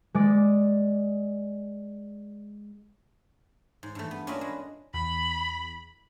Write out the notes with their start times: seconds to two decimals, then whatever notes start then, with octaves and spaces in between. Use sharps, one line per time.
0.15 G#3 D5
3.83 G#2
3.95 G2 E3 A3
4.11 B3
4.27 C#4 D4 F4 A#4 D#5 E5
4.41 G#3 B4
4.94 E2 B5